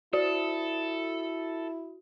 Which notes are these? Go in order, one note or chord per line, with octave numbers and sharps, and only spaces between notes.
E4 F#4 A4 D5